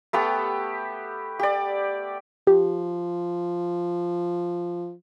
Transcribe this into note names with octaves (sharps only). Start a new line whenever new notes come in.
A3 B3 G4
G4 D5
F3 G4